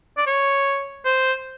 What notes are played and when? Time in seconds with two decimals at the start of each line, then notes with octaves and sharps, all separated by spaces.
0.18 D5
0.27 C#5
1.05 C5